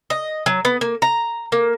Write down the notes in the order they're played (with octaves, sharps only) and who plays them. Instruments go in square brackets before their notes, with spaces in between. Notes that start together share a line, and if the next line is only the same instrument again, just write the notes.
[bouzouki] D#5
F#3
B3
A#3
A#5
A#3